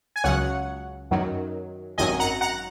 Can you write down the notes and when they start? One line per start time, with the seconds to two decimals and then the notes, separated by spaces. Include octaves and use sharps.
0.16 G#5
0.24 C#2 C#3 F#3 C#5 F#5
1.11 F#2 D#3 F#3
1.98 G#1 F#2 D#3 F#3 D#5 G#5
2.19 F#5 A#5
2.41 F#5 A#5